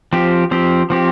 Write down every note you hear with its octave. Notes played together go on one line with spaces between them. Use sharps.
F3 C4 G4
F3 C4 G4
F3 C4 G4